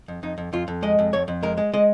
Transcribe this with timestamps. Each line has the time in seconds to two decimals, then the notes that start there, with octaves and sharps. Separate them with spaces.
0.08 F2
0.23 F2 D#4
0.38 F2
0.53 F2 F4
0.68 F2
0.82 G#3 D#5
0.99 F2
1.13 F2 C#5
1.28 F2
1.43 G#3 A#4
1.57 G#3
1.73 G#3 D#5